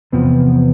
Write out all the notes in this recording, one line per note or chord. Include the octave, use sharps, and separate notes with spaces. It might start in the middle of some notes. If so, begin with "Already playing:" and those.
E2 C3 F3 B3